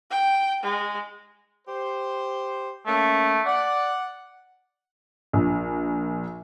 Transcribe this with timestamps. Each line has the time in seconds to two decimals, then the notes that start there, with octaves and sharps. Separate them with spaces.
0.10 G5
0.63 G#3
1.67 G4 C5
2.87 A3 A#3 C#4
3.46 D5 F#5
5.33 A#1